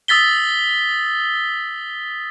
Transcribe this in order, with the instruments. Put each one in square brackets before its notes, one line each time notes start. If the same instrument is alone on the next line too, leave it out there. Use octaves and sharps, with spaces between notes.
[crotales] D#6 E6 A6 B6 G7